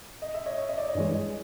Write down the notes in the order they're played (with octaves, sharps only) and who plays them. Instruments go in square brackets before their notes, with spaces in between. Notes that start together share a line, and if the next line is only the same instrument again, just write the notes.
[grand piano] D#5
E5
C#5 D#5
E5
D#5
D5
C#5 D#5
[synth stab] G2 E3 G#3